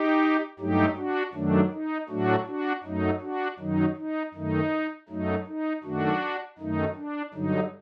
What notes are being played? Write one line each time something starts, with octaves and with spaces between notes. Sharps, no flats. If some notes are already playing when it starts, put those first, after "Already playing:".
Already playing: D#4 G4
G2 F#3 A3 D#4 G4
D4 F#4
F#2 D#3 F#3 A3 D4
D#4
A2 F#3 A3 D4 F#4
D4 F#4
F#2 F#3 A3 D#4
D4 F#4
F#2 D#3 F#3 D#4
D#4
F#2 D#3 A3 D#4
F#2 F#3 A3 D#4
D#4
F#2 D#3 A3 D4 F#4
F#2 D#3 A3 D#4
D4
G2 D3 F#3 D#4